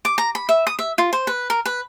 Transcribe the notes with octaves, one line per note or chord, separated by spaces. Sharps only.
D6
A#5
B5
E5
D#6
E5
F4
C5
B4
A#4
B4